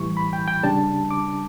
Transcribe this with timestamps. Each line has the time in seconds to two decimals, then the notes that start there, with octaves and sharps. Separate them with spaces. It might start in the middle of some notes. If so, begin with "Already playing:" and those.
Already playing: A2 E3 G3 C#6
0.17 B5
0.33 G5
0.48 G5
0.63 C#3 G3 D4 A5
1.11 D6